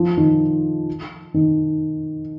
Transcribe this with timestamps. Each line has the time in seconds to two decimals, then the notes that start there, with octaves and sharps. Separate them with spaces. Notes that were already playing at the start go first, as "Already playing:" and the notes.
Already playing: F3
0.17 D#3
1.34 D#3